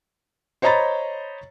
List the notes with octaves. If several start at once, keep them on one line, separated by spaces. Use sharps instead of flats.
C5 C#5 D#5 A#5 B5 A6